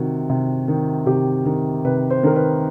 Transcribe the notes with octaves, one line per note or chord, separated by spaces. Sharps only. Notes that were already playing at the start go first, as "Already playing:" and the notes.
Already playing: C3 D#3 F#4
C3
D#3
C3 G4
D#3
C3 B4
C5
D#3 A#4
B4